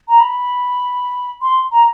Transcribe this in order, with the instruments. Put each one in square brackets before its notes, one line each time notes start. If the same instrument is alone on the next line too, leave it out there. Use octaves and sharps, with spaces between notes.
[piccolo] A#5
B5
C6
A#5